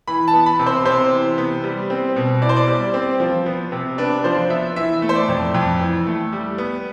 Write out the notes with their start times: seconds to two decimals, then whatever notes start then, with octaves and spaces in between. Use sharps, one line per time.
0.08 E3 B5
0.28 A5
0.33 B3
0.46 B5
0.59 C3
0.66 C5
0.85 C3 C5
1.12 E3
1.38 B3
1.64 G3
1.90 C4
2.16 B2
2.42 E4 D5
2.49 C5
2.56 D5
2.68 G3
2.94 C4
3.20 F3
3.46 B3
3.72 C3
3.98 D4 B4
4.24 F3 C5
4.50 B3 E5
4.76 E3 E5
5.02 A3
5.09 C5
5.15 D5
5.29 F2
5.54 F2
5.81 E3
6.07 A3
6.33 G3
6.58 B3